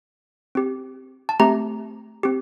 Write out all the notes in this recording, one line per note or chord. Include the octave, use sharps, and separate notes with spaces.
C4 G4
A5
A3 C4 G4 A#5
C4 G4